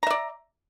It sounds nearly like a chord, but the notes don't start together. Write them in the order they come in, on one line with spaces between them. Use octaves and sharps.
A#5 E5 D5